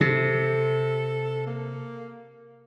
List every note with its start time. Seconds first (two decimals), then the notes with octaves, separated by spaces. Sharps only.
0.01 C3 A4
1.47 A#3